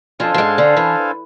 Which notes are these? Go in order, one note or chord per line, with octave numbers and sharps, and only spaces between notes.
F2 F3 D4 A4 C5 F5 G#5
F3
G#2 G#3
D3
E3